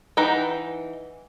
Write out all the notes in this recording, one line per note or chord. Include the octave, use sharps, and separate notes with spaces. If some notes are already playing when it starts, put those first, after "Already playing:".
E3 D#4 F#5 G5